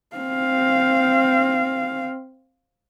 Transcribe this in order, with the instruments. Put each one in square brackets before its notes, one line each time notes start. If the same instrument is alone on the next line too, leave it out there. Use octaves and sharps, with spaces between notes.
[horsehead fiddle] C4 F5